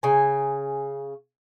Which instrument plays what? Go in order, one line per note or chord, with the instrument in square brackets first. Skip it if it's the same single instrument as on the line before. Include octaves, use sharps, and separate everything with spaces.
[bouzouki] C#3 G#5